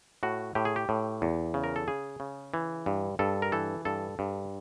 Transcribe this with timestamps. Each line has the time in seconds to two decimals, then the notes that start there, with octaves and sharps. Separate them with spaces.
0.23 A2 F#4
0.55 A2 G4
0.65 G#4
0.76 G4
0.89 A2
1.22 E2
1.54 C#3
1.64 A#4
1.76 A4
1.88 C#3 G#4
2.20 C#3
2.54 E3
2.86 G2
3.19 G2 A4
3.42 A#4
3.52 E3 A4
3.85 G2 A4
4.19 G2